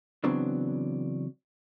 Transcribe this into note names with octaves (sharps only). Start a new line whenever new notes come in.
C#3 E3 F#3 B3 C4 D4